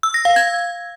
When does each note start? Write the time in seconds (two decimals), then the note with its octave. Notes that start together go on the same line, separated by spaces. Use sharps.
0.03 E6
0.14 A#6
0.25 F5
0.36 G#6